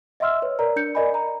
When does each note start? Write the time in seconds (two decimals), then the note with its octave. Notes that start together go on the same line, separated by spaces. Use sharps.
0.20 D#5 E5 F#5 C6 E6 F6
0.42 B4 C#5
0.59 A#4 D5 A#5
0.76 D4 G6 C#7
0.95 A#4 D5 D#5 G#5 B5
1.14 A#5